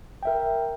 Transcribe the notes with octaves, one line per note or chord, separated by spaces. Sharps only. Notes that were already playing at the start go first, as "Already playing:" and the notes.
A#4 E5 G5